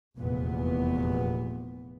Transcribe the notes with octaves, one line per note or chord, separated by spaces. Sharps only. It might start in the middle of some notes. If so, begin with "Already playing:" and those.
F1 E2 A#2 B3